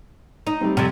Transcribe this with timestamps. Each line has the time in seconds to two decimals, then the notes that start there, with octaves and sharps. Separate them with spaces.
0.47 D#4
0.61 G3 A3 C4
0.77 F2 C3